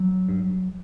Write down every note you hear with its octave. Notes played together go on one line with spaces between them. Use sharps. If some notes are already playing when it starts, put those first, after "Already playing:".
Already playing: F#3
G2